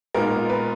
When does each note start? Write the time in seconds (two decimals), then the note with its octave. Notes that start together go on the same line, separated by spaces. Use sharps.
0.14 A#2 G#3 B3 D#4 A#4
0.49 B4